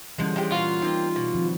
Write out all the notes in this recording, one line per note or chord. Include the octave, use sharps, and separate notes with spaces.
D3 E3 F3 G3 G#3 C#4
F3 G#3 G4
A#2 F4 F#4 F5
A#3 C4 D#4
B2
D#3 F3 C4